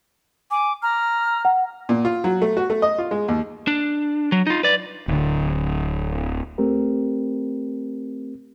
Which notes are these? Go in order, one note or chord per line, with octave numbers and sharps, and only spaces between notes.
G#5 D6
A#5 F6
F#5
A#2
F4
F#3
A3
F#4
A3
D#5
F4
G#3
D#2
D4
F#3
D#4 F4
B4 D5
D1 D3
A3 C4 G4 A#4